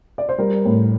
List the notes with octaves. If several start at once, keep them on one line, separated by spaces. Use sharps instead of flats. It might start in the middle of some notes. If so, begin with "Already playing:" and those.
D5
C5
G3 A#4
A2